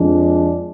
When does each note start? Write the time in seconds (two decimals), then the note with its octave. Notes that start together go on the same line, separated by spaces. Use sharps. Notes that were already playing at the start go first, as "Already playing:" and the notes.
Already playing: F2 F3 G#3 D4